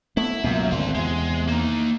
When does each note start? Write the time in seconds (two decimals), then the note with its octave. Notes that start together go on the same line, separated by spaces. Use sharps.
0.17 A3 B3 E4
0.44 C#2 F#2 B2 A#3
0.71 G#1 D2 C4 F5
0.95 E2 C3 G#3
1.48 A#3 D#4